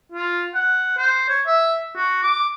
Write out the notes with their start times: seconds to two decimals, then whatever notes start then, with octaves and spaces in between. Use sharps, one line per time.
0.12 F4
0.55 F#5
0.98 C5
1.29 C#5
1.47 E5
1.96 F#4
2.23 D6